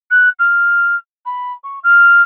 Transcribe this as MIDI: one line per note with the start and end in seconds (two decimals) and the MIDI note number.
0.10 0.29 90
0.39 0.95 89
1.25 1.52 83
1.63 1.79 85
1.83 2.22 89